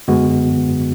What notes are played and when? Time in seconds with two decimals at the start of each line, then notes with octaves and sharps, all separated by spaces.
0.08 F#2 D3 G#3 B3 F#4